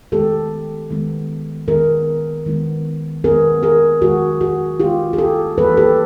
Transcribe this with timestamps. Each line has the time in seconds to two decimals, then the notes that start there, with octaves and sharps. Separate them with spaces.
0.12 D#3 G#3 B3 G4 A4
0.90 D#3 G#3 B3
1.68 D#3 G#3 B3 G#4 A#4
2.46 D#3 G#3 B3
3.24 D#3 G#3 B3 G#4 A#4
3.63 G#4 A#4
4.02 D#3 G#3 B3 F#4 G#4
4.41 F#4 G#4
4.80 D#3 G#3 B3 F4 G4
5.13 G#4
5.18 G4 A4
5.58 E3 G3 A#3 A4 B4
5.77 G4 A4